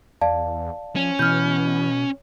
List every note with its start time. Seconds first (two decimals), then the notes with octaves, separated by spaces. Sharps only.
0.21 E2 D5 F5 A5
0.96 F3 C#4
1.19 B2 E3 F6 G6